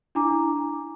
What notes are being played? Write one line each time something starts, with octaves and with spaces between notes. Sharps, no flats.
D4 E4 G#5 A#5 D6